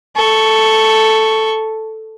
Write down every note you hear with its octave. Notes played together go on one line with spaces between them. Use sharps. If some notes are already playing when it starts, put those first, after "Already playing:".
A4 C#6